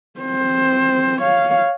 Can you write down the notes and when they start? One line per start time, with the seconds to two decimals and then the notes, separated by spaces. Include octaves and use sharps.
0.20 C4 C5
1.22 C#5 F5